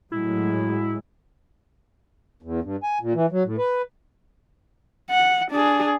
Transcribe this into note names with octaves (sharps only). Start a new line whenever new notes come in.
A2 F#3 G#3 E4
E2
G2
G#5
A#2
E3
F#3
A2
B4
F#5
D4 G#4